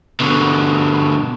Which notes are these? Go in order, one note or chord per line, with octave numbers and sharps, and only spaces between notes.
B2 D3